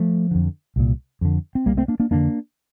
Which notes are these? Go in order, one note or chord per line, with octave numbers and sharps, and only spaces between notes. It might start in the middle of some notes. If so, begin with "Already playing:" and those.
Already playing: F3 A3
F2 D3
C2 A#2
F2 D3
C4
C2 C3 G3 A#3
A3 C4
A#3 D4
A#3 D4
F2 D3 A#3 D4